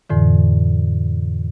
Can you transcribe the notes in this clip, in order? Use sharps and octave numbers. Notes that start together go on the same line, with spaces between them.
F2 A2 D3 E3